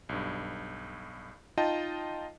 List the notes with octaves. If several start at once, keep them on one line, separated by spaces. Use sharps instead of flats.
B1 G2
D#4 F4 D#5 G5 A5